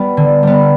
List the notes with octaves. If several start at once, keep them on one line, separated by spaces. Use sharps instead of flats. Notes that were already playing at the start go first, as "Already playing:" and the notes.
Already playing: G3 B3
D3
G3 B3